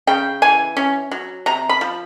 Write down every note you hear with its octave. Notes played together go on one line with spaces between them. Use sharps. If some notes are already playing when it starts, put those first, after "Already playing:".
C#3 G5
E3 G#5
C#4
F#3
C3 A#5
B5
F3